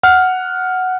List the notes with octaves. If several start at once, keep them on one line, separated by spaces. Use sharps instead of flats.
F#5 F6